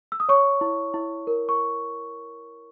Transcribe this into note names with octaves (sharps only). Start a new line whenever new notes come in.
E6
D#6
C#5 C#6
E4
E4
A#4
C#6